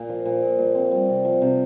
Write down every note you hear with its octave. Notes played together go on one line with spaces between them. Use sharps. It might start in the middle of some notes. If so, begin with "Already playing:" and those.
Already playing: A#2
F3
A#2
A#2
A#2
C4
G3
C3
F3
C3